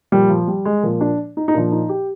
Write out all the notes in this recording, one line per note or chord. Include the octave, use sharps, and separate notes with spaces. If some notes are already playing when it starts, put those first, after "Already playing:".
A#2 F3 G3
F3
G3
G#3
A#2 F3 A#3
D4
D#4
D#4
A#2 F3 D4
D#4
G4